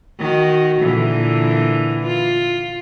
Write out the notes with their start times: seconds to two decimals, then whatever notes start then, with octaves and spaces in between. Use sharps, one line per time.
0.19 D#3 F#4
0.80 A#2 D3 E3
2.06 F4